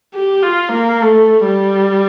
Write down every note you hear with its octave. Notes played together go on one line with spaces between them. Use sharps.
G4
F4
A#3
A3
G3